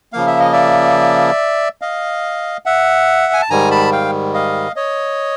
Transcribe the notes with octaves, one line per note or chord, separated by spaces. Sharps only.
C#3 F3 A#3 F5
E5
D#5
D5 E5
D#5 F5
E5 F#5
G#5
A5
G#2 D#3 G3 G#5 A#5
A5 B5
F5 G5
D#5 F5
C#5 D#5